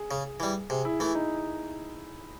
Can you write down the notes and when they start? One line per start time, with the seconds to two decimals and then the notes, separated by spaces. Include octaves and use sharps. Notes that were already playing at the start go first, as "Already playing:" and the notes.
Already playing: G#4
0.11 C#3
0.40 E3 G3
0.70 C3 G#4
0.85 E4
1.00 E3 A3 E4
1.15 D#4